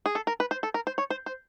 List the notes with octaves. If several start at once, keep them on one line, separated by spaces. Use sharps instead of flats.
G#4
A4
A#4
B4
C5
A4
A#4
C5
C#5
C5
C5